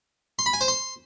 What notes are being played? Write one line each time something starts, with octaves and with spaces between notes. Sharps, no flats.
C6
B5
G#5
C5
C6